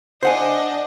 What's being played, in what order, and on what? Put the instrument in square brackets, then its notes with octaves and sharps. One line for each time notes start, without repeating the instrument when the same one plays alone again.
[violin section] D4 D#5 [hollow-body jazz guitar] C5 F#5 G#5